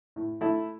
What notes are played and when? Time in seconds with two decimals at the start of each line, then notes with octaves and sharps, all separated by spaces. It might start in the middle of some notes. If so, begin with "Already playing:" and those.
0.16 A2
0.41 A3 E4